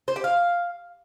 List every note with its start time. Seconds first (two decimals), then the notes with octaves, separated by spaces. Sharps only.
0.08 C5
0.16 G4
0.24 F5